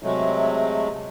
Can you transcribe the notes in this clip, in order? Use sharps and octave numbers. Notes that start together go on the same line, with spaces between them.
C3 F#3 G#3 A3